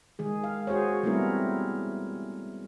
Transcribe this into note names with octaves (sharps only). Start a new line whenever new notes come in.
D#3 G#3 G#4
F5
F#4 G#4 C5 C#5
G3 A3 B3 C4 E4 A#4